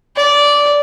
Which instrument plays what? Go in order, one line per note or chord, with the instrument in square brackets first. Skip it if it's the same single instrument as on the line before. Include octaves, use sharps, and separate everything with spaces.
[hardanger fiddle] D5